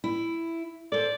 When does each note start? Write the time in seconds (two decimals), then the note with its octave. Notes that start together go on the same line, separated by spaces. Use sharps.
0.04 E4
0.92 A4 C5 D5